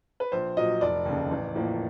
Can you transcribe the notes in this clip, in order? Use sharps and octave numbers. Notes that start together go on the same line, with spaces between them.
B4
A#1 C5
A#2 F#3 D#5
F1 D5
D#2 C#3
A1
A2 F3 A#3